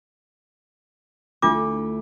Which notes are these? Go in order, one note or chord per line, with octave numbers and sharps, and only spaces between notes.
D2 A3 D4 E4 F4 D6